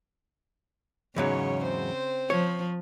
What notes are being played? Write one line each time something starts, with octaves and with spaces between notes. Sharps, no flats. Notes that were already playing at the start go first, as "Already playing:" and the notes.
E2 G#2 C#3 F#3 C#5
C4 C5
F3 C#5